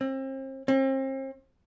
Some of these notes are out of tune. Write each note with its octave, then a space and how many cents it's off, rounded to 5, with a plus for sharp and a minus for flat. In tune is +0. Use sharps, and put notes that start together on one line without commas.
C4 +35
C4 +40